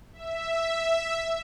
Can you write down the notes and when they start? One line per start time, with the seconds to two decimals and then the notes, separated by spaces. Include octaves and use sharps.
0.13 E5